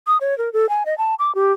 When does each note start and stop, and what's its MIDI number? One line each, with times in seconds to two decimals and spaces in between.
0.07 0.18 87
0.21 0.37 73
0.38 0.52 70
0.53 0.69 69
0.69 0.83 80
0.86 0.96 75
0.98 1.15 81
1.19 1.34 86
1.35 1.53 67